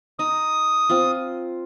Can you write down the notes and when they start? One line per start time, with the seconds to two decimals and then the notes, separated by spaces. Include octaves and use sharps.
0.19 D#4 D#6
0.90 C4 F4